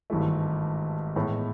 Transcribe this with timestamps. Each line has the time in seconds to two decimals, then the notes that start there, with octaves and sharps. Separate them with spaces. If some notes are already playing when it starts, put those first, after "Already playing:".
0.10 G#1 G2 E3 A3
1.16 A2 E3 G#3 B3